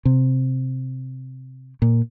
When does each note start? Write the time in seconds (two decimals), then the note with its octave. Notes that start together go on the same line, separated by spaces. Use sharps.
0.05 C3
1.82 A#2